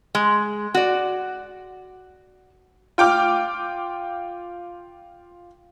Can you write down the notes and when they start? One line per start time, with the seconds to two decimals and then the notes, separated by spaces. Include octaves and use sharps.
0.15 G#3
0.74 F#4 D5
2.98 F4 G5 D6 F6